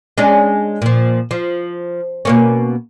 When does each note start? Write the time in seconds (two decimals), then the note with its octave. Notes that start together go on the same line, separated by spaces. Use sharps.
0.18 G#3 C#4 D4
0.82 A#2 F3
1.31 F3
2.25 B2 A#3 C#4